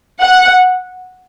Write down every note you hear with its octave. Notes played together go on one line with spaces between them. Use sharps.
F#5